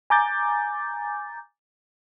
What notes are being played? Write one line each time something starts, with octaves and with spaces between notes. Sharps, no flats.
G#5 A#5 D6 G6 A6